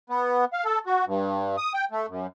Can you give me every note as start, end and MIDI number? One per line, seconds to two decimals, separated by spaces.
0.10 0.45 59
0.53 0.64 77
0.65 0.79 69
0.86 1.05 66
1.07 1.56 43
1.57 1.73 87
1.74 1.85 79
1.91 2.06 57
2.08 2.27 42